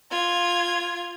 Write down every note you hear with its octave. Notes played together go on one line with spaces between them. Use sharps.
F4 G#6